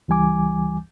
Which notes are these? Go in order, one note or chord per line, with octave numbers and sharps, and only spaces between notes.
C#2 E3 G3 G#5 D6